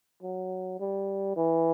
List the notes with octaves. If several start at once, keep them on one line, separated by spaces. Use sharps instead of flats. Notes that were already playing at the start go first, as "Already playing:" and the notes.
F#3
G3
E3